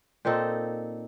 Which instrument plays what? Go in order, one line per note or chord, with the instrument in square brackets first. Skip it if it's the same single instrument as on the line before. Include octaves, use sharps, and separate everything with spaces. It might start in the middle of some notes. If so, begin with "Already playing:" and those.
[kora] A#2 C4 D#4 A4